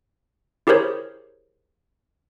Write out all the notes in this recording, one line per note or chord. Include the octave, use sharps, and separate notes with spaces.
E4 G4 G#4 A#4 C5 C#5